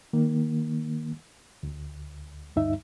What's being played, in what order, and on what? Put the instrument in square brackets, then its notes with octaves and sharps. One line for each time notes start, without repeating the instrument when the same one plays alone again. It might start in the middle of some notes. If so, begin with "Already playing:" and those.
[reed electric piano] D#3 A#3
D2
D2 G2 D#4 E5